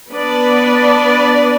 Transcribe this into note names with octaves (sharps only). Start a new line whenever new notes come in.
B3 D4 B4 D5